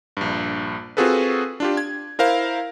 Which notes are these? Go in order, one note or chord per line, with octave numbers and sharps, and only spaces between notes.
A#1 G2
C4 F4 F#4 G#4 A4 B4
D4 F4 G4
G#6
E4 A#4 C5 F5